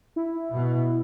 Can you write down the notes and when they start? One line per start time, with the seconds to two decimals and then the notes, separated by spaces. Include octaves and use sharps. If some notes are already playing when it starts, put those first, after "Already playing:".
0.16 E4
0.52 B2